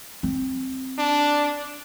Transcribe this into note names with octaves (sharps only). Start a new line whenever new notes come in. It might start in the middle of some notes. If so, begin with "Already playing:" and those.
C4
D4